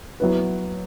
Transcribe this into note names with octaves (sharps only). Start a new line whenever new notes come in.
F#3 B3 E4 B4